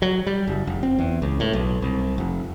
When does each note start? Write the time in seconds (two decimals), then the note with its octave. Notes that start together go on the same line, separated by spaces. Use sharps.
0.02 F#3
0.27 G3
0.47 F#1
0.67 F1
0.83 C4
0.99 E2
1.22 C#2
1.40 A2
1.53 B1
1.82 C2
2.18 F1